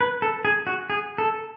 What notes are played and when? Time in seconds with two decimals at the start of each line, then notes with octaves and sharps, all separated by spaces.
0.01 B4
0.22 A4
0.45 G#4
0.67 F#4
0.90 G#4
1.18 A4